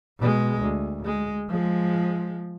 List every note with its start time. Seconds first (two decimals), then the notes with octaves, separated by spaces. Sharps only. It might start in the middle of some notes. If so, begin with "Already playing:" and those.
0.19 B2 G#3
0.61 D2
1.05 G#3
1.49 F3 G#3